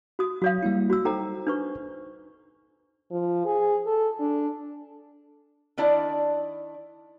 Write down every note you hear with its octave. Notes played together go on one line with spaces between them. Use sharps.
F#4 D#6
F#3 F#4 C#5 F5
G3 A#3 E4
F#4 E6
D#4 A4 C5 G5 A#5
D4 B4 C#6
F3
G#4
A4
D4
D#3 D4 E4 D5 A5